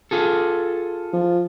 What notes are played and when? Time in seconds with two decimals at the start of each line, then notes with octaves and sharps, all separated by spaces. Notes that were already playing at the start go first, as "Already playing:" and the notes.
0.11 F4 G#4 A4
1.13 F3